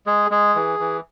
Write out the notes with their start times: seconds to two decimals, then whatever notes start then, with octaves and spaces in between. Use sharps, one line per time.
0.06 G#3 G#4
0.31 G#3 G#4
0.55 E3
0.80 E3